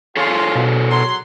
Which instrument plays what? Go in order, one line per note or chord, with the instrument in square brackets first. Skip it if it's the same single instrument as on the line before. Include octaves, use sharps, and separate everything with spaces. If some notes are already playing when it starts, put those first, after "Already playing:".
[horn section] F4 [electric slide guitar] G#4 A4 C#5
[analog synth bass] B2
[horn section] F#3 C6